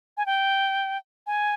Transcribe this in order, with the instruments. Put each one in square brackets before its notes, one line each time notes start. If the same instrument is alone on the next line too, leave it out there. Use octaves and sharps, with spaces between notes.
[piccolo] G#5
G5
G#5